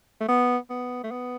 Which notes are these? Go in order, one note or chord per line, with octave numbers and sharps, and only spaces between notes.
A3
B3
B3
A3
B3